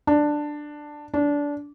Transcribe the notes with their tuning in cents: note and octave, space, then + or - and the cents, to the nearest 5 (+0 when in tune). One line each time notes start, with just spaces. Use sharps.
D4 +10
D4 -20